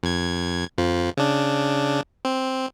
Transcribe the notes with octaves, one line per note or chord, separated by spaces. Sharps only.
F2 G#6
F2 F3
C#3 D4
C4